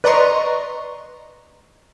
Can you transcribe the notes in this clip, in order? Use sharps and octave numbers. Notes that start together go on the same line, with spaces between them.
B4 D5 D#5 A#5 C6 C#6